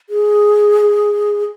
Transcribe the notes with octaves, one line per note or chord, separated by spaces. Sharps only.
G#4